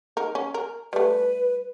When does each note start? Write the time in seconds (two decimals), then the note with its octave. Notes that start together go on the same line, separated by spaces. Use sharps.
0.17 D#4 A#4
0.35 C#4
0.54 A#4
0.93 G3 A3 B4